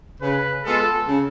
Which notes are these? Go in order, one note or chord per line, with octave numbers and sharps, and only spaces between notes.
C#3 B4
G#3 B3 F4 A4
C#3